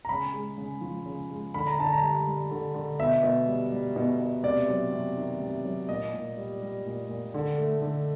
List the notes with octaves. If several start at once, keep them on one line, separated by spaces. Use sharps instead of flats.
A#5
C#3 B5
G#3
C#3
F3
C#3
G#3
D3 B5
A#5
D3 A5
A#5
G3
G3
D3
D3
B2 E5
B2
G3
G3
B2
B2
C3 D5
F#3
C3
D#3
C3
F#3
A#2 D#5
A#2
G3
G3
A#2
A#2
D3
A3
D3